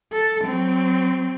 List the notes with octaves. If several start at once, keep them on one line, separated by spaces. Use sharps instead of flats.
A4
F#3 C4